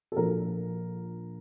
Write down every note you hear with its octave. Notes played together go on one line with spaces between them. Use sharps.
A4
A#1 A#2 F3 A#4